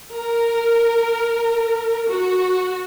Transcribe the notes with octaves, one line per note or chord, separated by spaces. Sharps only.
A#4
F#4